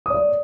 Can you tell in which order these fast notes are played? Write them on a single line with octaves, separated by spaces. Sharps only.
D#6 C#5 D5